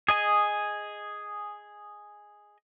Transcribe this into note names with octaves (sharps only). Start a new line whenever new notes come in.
G#4 D#5 G#5